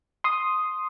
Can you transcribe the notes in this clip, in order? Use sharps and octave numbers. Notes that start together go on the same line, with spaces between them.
C6 D#6